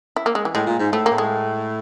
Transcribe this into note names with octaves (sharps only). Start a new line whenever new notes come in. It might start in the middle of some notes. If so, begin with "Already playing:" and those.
E4
A#3
G#3
E3
A2 G#3
A#2
G#2
A2 A3
A#3
A2
G#3